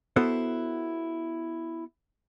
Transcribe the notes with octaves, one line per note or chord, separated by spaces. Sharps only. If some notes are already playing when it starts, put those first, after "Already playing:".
B3 E4 F#4 A4 C5